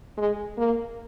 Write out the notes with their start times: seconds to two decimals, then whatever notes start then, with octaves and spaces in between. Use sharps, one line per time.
0.17 G#3
0.58 A#3